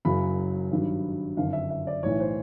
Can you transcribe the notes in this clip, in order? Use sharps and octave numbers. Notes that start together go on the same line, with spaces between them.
F#1 F#2 C#3 F#3 B5
G#1 G2 D#3 F#3
G1 F#2 D#3 F5
E5
E5
D5
B1 A2 E3 C#5
C5